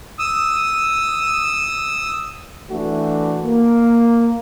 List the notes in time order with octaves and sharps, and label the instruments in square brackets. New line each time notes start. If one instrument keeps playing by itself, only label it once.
[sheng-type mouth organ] D#6 E6
[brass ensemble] E3 A3 D4 F#4
A#3